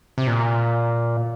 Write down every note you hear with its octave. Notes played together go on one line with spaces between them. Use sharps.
C3
A#2